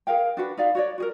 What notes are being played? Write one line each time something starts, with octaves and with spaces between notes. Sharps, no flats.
G#4 A#4 F5 G5
D4 F#4 B4
D#4 D5 F5
F#4 C#5 D5
F#4 G#4 A#4